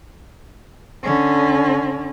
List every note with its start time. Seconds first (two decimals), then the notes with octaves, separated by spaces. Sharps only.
1.03 D3 C#4